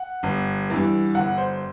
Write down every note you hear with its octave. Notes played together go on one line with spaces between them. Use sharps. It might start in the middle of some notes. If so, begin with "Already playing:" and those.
Already playing: F#5
G1
G2 E3
G1 F#5
C5